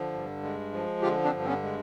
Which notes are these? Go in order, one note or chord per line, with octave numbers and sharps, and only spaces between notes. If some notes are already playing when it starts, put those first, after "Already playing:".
Already playing: D3 F3
G2
G#3
F3
D3 F4 G4
C4 D4
G2
C4
B3 C#4
G#3